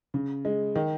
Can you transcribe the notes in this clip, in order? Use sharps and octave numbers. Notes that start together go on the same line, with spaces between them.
C#3
G#3
D#3